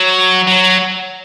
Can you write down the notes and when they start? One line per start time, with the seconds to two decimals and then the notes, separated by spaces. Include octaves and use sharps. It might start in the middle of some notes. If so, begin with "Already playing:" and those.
Already playing: F#3
0.47 F#3